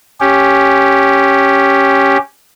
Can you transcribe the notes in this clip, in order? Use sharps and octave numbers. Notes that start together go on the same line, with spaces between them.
C#4 G4